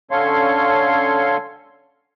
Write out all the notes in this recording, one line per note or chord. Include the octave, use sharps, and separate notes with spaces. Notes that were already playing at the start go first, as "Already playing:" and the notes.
D3 C#4 A4 C#5 F5 C6